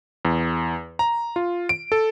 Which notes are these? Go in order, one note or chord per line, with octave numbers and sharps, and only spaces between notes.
E2
A#5
F4
D7
A4